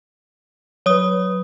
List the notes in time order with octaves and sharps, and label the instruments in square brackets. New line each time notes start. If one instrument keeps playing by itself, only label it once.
[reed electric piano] F#3 B4 [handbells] C#5 D#6